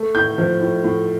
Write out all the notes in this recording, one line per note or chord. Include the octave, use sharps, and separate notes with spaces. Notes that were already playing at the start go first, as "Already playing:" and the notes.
Already playing: A3
A2 G6
F3
A2
A2